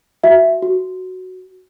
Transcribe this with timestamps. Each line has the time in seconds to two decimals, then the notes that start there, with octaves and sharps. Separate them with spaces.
0.24 F#4 E5
0.62 F#4